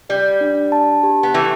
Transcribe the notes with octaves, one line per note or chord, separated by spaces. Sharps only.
G3 D5
D4
A5
G4
B3
E3 A3 G5